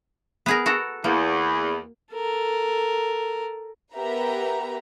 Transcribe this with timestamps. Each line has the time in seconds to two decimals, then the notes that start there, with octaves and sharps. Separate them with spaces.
0.46 B3 G#4 A#4
0.66 F#4 A4 A#4
1.04 E2 A#3
2.14 A4 A#4
3.96 B3 G4 A#4 B4 E5 A#5